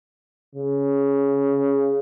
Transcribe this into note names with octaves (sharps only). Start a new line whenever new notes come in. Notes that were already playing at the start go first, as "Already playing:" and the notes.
C#3